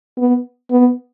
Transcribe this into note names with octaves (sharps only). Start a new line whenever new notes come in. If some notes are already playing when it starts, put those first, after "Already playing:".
B3
B3